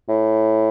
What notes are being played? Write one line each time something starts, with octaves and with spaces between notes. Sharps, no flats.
A2